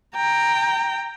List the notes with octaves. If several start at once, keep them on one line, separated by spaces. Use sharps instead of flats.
G5 A#5